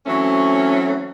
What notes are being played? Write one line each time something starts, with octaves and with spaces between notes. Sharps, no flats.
E3 F#3 A3 C4 C#4